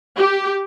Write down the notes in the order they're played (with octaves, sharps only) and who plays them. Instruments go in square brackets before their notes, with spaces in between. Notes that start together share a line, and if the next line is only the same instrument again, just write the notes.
[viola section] G4